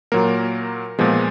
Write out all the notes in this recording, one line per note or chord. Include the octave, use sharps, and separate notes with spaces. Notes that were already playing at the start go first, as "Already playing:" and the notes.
A#2 F#3 A#3 A#4
A#2 F3 G#3 B3